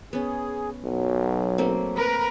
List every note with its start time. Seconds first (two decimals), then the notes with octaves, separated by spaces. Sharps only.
0.13 B3 C#4 G#4
0.85 B1 F#3
1.58 A3 A#3 C4
1.96 A#4 B4